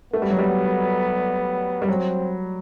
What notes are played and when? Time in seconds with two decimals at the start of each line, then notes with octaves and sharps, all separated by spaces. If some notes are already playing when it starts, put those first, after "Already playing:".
0.14 A3 B3
0.22 G3
0.30 F#3
0.39 G3
1.82 G3
1.88 F#3 C4